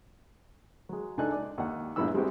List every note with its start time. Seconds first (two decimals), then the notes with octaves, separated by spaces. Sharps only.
0.89 F#3 G#3
1.18 C#2 D4 D#4 A4 G#5 F#6
1.32 D5
1.58 D#2 F#5
1.96 A#1 G2 B3 E4 B5 E6
2.14 G3 G#3 C4 F#4 G4